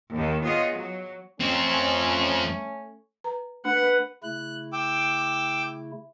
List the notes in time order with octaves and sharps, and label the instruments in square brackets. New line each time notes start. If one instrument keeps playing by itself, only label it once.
[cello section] D#2 D#3
B3 F4 G#4 C#5 D#5
F#3
[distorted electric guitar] F2 C4 [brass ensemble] A3 C#4
[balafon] B4 A#5
[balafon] A3 D4 [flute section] B4 [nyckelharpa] F#5
[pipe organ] C#3 A3 E4 [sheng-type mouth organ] F#6
[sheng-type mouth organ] G5 D6 E6